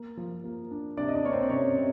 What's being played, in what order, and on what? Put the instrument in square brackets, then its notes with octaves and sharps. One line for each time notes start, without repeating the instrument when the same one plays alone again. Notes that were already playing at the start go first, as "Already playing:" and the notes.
Already playing: [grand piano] A#3
F3
A#3
D4
C3 D4 D5
D#5
D4 D5
A#3 C#5
C4 C5
D5
C3 C#4 C#5
C3